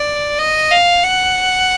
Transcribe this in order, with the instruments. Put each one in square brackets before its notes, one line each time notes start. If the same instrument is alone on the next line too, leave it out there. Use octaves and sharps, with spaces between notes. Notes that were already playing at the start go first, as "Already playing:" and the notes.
Already playing: [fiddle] D5
D#5
F5
F#5